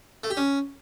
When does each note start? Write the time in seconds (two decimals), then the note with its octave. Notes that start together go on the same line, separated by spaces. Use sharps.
0.24 A3
0.30 G4
0.37 C#4